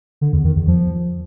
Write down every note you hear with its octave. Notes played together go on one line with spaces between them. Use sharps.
D3
E2
D#3
E2
F3